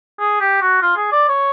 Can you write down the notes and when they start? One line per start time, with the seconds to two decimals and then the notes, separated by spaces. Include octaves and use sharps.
0.20 G#4
0.41 G4
0.61 F#4
0.82 F4
0.97 G#4
1.12 D5
1.29 C#5